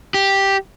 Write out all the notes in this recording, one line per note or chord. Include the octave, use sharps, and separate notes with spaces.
G4